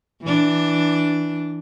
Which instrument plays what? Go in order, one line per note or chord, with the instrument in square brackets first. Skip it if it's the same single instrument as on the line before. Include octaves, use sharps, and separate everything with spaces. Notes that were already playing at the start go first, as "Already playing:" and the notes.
[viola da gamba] E3 D4